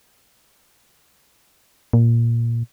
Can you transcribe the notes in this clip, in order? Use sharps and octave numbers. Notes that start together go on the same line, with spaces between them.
A#2